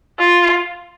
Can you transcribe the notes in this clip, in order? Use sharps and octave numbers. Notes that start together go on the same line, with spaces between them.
F4